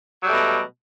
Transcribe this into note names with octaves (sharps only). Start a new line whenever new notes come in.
B2 F#3 G3 A3